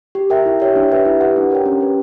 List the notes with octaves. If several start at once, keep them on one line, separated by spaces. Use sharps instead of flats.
G4
A#4 E5 G5
E4
G4 C#5 E5 G5
D4
G4 B4 E5
E4
G4 B4 F#5
D4
G4 A#4 C#5 G5
C#4
G4 B4